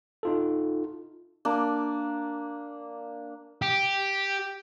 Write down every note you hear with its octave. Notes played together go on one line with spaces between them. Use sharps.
D#4 F4 A4
A#3 D4
G4